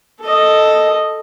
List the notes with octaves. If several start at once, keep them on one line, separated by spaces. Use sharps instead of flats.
A4 D#5